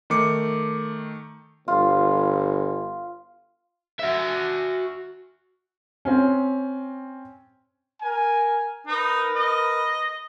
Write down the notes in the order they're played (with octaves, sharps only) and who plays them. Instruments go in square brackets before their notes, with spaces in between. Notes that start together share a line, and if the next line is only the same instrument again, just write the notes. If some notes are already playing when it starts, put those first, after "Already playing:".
[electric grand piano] D#3 A3 D6 C#7
[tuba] G1 [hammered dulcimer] F4
[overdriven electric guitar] F#4 E5
[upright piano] C4 C#4
[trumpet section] A#4 G#5
[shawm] D#4 [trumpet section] A#4 B4
[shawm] D#5